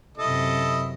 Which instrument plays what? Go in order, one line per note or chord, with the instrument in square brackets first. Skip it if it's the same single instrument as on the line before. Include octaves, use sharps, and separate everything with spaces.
[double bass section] F#2 C3 [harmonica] E4 A4 D#5